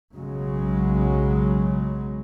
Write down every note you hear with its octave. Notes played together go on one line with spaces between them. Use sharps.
B1 C#3 F#3 G#3